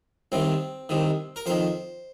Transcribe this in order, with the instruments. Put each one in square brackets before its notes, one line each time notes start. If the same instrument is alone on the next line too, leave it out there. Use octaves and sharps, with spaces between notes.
[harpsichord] C2 C3 D#3 C4
C2 C3 D#3
A#4
F2 D#3 C5